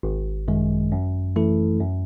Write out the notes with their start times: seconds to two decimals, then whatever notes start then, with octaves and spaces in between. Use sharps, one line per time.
0.03 G#1
0.48 F#2 D#3 G#3
0.92 F#2
1.36 E3 A3 E4 A4
1.80 F#2